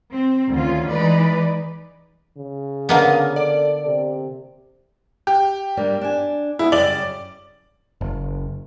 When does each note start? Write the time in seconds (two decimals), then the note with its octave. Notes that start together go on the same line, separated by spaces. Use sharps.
0.12 C4
0.50 D2 D#3 C#4 F4
0.90 E3 G#3 D#4 B4 D5
2.38 C#3
2.89 D3 A#3 B3 A#4 D#5 F5
3.36 A4 D5
3.86 C3
5.27 G4
5.77 G3 A#3 D4
6.01 D4 G#5
6.59 B3 E4 G#4
6.72 F#2 C#3 G3 D5 F#7
8.01 F#1